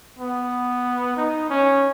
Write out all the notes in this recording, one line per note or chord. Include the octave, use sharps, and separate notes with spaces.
B3
D#4
C#4